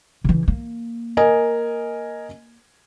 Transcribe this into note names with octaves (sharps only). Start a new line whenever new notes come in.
C#3 E3
A#3
A#4 D#5 G#5